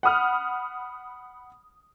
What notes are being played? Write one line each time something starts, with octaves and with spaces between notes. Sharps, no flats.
F#5 B5 D#6 F6